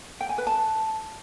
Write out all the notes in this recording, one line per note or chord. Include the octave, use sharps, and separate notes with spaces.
G5
G#5
B4
A5